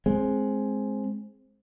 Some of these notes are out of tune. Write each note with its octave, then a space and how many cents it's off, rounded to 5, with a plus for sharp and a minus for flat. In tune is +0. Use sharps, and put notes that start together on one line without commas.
G#3 +10 C4 +10